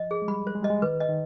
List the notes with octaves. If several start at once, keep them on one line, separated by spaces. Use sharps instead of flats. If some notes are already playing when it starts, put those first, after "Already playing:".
Already playing: F3 D#5
G#4
G#3
G3 B5
C5
G#3
G3 D#5
G#3
D#3 B4
D#5
D#3